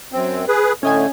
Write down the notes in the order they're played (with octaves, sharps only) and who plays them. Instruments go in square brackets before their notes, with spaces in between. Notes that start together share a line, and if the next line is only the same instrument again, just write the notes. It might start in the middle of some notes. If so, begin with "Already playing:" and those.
[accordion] F#2 C4
G#4 B4
[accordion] A2 D3 A3 [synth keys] C#4 D#5 G#5